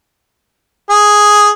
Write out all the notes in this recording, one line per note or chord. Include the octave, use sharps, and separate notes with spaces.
G#4